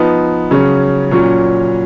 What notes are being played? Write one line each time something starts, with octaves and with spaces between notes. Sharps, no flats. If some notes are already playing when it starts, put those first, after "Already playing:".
Already playing: F3 B3 D#4
C#3 F#3 C#4
A#2 F#3 C#4